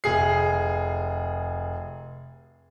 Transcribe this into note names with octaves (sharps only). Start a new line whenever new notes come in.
F1 G#4 C7